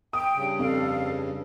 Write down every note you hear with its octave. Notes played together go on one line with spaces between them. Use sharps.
G5 D#6
G2 C#3
F2 A4 F5